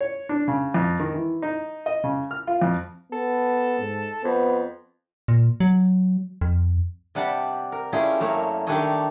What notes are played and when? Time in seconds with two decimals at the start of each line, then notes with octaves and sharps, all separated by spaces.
0.01 C#5
0.29 D4
0.48 C#3
0.74 F2
1.00 D#3
1.14 E3
1.42 D#4
1.86 D#5
2.04 C#3
2.31 F6
2.47 F4
2.61 F2
3.12 B3 A4
3.79 G#2
4.24 F2 B3 C5
5.28 A#2
5.60 F#3
6.41 F2
7.15 C3 G3 F#5 A5 B5
7.72 A#4
7.93 G3 A3 C#4 E4 F4 G#4
8.20 F#2 A3 A#3 C#5
8.67 D#3 G3 D4 A4 C#5 D#5